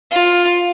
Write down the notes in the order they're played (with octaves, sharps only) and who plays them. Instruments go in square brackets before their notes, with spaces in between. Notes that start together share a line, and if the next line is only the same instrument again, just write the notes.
[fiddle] F4